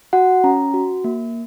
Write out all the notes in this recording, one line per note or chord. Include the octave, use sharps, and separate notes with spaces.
F#4 F#5
C#4 A#5
F#4
A#3